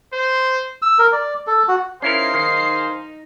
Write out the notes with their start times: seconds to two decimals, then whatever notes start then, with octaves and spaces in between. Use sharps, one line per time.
0.13 C5
0.82 E6
0.99 A#4
1.12 D5
1.47 A4
1.68 F#4
2.02 C#4 D#4 E4 G#4 A#4 C5 F5 C7
2.34 D#3